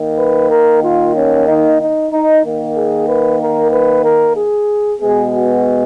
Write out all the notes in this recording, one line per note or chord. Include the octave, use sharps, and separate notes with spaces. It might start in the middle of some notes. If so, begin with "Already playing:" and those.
Already playing: D#3 A#3
B4
A#4
F4
C#4
D#4
D#4
D#4
D#3 A#3
G#4
B4
A#4
B4
A#4
G#4
B2 G#3 B3 G#4
F#4